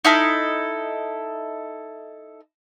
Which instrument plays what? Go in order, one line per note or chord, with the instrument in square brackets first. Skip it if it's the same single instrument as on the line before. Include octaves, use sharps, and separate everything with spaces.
[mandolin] D#4 E4 A4 F6